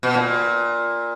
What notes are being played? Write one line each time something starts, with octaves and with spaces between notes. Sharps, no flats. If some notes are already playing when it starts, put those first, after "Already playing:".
B2
A#2